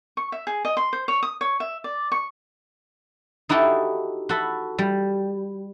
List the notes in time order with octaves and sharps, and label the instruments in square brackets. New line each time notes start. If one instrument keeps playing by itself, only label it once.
[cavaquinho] C#6
E5
G#4
D#5
C6
C5
C#5
D#6
C#5
E5
D5
C#6
[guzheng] D#4 E4 F#4 G4 A4
F#4 A4 B5
G3